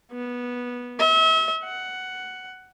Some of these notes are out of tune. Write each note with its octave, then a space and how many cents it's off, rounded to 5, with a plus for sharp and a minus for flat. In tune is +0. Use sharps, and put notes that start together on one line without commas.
B3 -15
E5 -35
F#5 +10